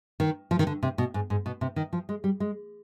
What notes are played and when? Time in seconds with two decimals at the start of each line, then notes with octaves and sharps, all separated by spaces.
0.20 D#3
0.51 F3
0.59 D#3
0.67 D3
0.83 C3
0.98 B2
1.14 G#2
1.30 G#2
1.46 B2
1.61 C3
1.76 D#3
1.93 F3
2.09 G#3
2.24 G3
2.40 G#3